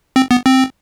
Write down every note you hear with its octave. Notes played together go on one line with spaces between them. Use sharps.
C4
B3
C4